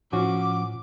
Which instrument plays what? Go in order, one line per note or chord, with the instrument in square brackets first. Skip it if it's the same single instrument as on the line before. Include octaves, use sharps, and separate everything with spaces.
[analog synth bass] A2 [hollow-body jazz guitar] F3 C#4 F#4 [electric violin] D6